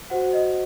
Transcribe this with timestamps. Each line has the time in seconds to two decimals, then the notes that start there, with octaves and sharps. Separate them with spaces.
0.10 F#4 C5 F#5
0.33 D#5